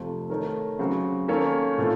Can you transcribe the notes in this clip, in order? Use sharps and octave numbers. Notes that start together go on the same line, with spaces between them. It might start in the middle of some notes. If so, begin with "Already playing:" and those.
Already playing: F2 C3 F3 A3 C4
D#3 A3 D#4 A#4 C#5
C#3 F#3 C4 F#4
D#3 A#3 C#4 A4 C#5
A2 A3 C4 F4